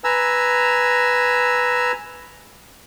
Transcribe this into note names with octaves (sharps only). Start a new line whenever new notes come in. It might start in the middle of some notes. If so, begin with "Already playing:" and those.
B4 G#5 A#5 E6